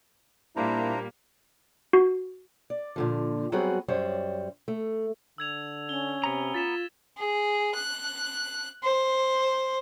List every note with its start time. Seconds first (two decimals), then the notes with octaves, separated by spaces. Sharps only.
0.56 A#2 G3 A#3 D4 E4 C5 A#5
1.93 F#4
2.70 D5
2.96 A#2 D3 F3
3.52 F#3 G3 B3 C4 F#4 G#4
3.88 F#2 G3 C5 C#5
4.68 A3
5.38 D3 E6 G#6 F7
5.89 C#4 G7
6.24 C3 B3 A#5
6.54 F4 A6 B6 E7
7.17 G#4
7.74 F#6
8.83 C5